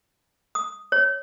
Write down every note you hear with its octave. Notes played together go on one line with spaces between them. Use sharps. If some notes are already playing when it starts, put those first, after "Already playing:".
D#6
C#5